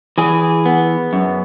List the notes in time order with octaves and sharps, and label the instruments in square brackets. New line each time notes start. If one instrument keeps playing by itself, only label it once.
[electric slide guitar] E3 G#4
B3
F#2